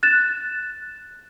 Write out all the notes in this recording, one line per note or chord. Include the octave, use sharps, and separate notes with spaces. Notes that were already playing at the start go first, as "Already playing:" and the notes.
F#6 A6 E7